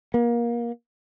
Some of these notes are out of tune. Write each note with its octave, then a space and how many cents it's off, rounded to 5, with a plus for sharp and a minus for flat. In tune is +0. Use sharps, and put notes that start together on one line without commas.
A#3 +25